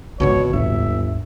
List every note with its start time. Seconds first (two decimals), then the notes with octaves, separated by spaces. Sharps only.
0.20 G#1 C#2 B2 D3 F3 G#3 C#5
0.53 G1 D#2 G#2 E5